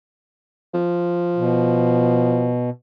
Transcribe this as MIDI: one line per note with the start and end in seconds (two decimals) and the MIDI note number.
0.74 2.55 53
1.37 2.70 47